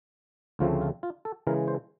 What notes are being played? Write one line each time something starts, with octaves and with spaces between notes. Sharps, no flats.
D2 C#3 F3 A3 C4 F4
F4
F4
A4
C#3 E3 G#3 A#4
C5